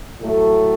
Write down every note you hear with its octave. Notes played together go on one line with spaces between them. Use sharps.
A2 F#3 A3